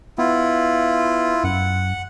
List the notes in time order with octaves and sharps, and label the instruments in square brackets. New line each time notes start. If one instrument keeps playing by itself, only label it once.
[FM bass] B3 [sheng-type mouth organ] E4 F4
[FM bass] F#2 [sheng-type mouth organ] F#5